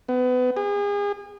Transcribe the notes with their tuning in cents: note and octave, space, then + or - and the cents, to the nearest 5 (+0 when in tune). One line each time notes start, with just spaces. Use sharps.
B3 +30
G#4 -35